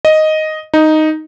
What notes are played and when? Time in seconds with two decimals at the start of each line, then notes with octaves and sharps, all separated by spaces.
0.05 D#5
0.74 D#4